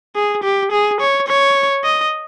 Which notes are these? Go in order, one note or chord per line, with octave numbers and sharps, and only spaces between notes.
G#4
G4
G#4
C#5
C#5
D#5